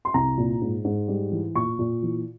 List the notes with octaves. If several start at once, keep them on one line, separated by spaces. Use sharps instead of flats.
C6
C2 A#5
A#2
G#2
G#2
G3
E3
A#2 C#6
A#2
E3